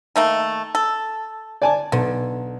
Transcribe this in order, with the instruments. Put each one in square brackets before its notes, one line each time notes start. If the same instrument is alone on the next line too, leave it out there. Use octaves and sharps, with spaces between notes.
[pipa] D#3 A3 A#3
A4
[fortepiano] D5 G#5 A5
[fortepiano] B1 [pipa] D3